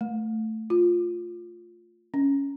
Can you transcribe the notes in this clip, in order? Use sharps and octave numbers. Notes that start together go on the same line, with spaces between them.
A3
F4
C#4